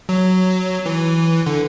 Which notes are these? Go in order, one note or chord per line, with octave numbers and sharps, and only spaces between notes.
F#3
E3
D3